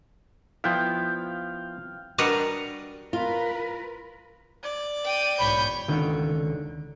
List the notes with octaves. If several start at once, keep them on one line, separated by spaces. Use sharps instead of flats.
F3 B3 E4 F5 G5
G3 D4 F#4 A#4 B4 D#5
F4 A#4 B4
D5
G5 D#7
B1 G#2 E3 C#5 B5 G6
C#2 D3 D#3